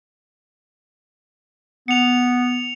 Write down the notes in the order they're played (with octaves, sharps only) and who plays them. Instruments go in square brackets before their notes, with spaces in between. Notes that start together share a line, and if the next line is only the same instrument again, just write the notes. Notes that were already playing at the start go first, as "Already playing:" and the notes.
[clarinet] B3 [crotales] C#7 F7